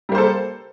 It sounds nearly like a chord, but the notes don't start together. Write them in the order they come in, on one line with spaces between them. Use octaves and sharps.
G3 A#3 C5 A4